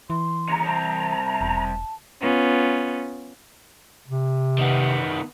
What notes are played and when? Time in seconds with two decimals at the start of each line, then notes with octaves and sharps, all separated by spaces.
0.10 E3 C6
0.48 D#2 C#3 A#5
0.65 C2 C4 A5
1.41 E1
2.22 B3 C#4 F4
4.08 C3
4.58 D#3 B3